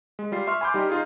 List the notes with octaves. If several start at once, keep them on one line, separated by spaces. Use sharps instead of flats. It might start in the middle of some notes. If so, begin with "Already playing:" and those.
G#3
G3 F4 C7
E5 C6 C#6 F6
G#5 B5 C6 D6 G6
G3 D#4 G4
D#4 F4 G#4